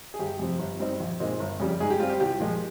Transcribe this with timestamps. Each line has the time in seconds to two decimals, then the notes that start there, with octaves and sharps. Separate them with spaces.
0.14 G#4
0.19 G1 G4
0.39 F2 C3 F3 C4
0.59 G1
0.79 G2 G3 C4 D#4
1.00 A#1
1.20 A#2 G#3 C4 D#4
1.40 G1
1.60 F2 C#3 G3
1.80 G#2 G#4
1.90 G4
2.00 G3 C4 F4
2.09 G4
2.20 C2 G4
2.39 A#2 F3 G#3